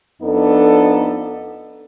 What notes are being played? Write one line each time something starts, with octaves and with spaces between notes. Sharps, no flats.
F2 B3 D4 D#4 A4